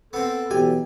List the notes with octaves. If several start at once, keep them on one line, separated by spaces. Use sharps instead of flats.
B3 C4 A4
B2 E3 F#3 G4 G#5